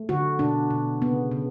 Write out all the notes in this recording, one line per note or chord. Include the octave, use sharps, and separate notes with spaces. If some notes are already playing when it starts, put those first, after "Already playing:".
Already playing: A3
D3 F#4
B2 D4
B2
C#3 B3
C#3